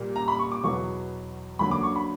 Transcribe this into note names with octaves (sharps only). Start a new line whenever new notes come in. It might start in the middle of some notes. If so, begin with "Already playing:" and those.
Already playing: A#2 G3 A#3
A#5
B5
C#6
D6
E2 B2 F#3 B3 C#6
D2 D3 F#3 A#3 B5
D6
C#6
B5